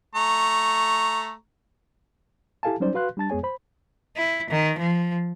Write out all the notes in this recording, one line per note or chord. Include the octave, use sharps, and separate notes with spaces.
A3 A#5 C#6
E4 G4 A4 F5 G#5 A5
F#3 G3 C#4 D#4 C5 D5
F#4 B4 F5 C6 F#6
G3 D4 A5 A6
F2 G#3 B3 G#4 C#5 G#5
C5 B5
E4
D#3
F3